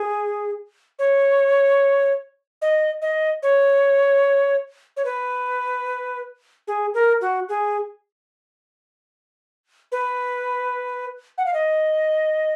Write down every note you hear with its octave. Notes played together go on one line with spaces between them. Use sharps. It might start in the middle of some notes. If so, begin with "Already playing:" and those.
Already playing: G#4
C#5
D#5
D#5
C#5
C#5
B4
G#4
A#4
F#4
G#4
B4
F#5
F5
D#5